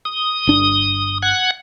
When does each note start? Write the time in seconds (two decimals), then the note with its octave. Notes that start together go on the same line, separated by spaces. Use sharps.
0.05 D#6
0.47 G1 D4
1.22 F#5 F#6 G#6